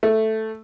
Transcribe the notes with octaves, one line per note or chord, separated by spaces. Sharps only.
A3